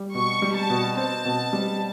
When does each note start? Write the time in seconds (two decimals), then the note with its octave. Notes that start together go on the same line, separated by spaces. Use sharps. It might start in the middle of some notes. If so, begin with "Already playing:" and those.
Already playing: G3
0.14 B2 C#6
0.42 G3
0.56 A5
0.70 B2
0.97 C4 A5
1.25 B2
1.53 G3